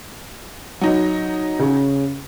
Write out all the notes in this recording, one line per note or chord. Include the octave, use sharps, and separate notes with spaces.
F#3 D#4
C#3